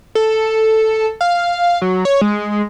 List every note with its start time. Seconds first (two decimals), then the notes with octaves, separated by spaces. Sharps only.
0.15 A4
1.21 F5
1.82 F#3
2.05 C#5
2.21 G#3